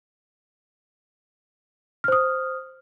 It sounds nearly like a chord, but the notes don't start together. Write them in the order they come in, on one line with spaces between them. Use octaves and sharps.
F6 C5 D#6